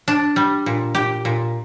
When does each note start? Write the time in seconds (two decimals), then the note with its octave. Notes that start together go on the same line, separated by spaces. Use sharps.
0.08 D4
0.36 G3
0.66 A#2
0.95 G4
1.25 A#2